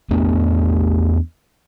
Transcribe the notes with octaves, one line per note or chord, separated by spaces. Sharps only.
E2 A3 B3 D4